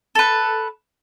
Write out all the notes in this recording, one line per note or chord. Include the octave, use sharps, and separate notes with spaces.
A4 B4